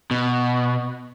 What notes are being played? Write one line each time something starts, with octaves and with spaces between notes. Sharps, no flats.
B2